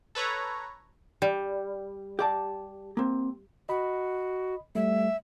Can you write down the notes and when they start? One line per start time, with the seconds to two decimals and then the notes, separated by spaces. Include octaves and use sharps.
0.15 A4 B4 C#5 A#5
1.22 G3
2.19 G4 D5 A5
2.97 A#3 C4
3.69 F#4 D#5 B5
4.75 G3 A3 E5